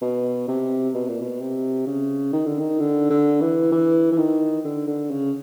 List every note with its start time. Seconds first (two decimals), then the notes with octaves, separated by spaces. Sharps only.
0.02 B2
0.48 C3
0.94 B2
1.08 A#2
1.21 B2
1.41 C3
1.87 C#3
2.33 D#3
2.46 D3
2.59 D#3
2.79 D3
3.10 D3
3.41 E3
3.72 E3
4.12 E3
4.18 D#3
4.65 D3
4.87 D3
5.11 C#3